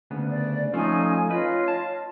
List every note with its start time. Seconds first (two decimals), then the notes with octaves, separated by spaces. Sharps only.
0.11 D2 C#3 B3
0.29 D5
0.74 F3 A3 C#4 D#4 F4 G#5
1.31 F4 B4 C#5 D#5
1.68 A5